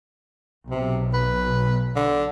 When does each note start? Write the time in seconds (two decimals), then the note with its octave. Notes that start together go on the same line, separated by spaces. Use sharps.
0.70 B1 C3
1.14 B4
1.96 D3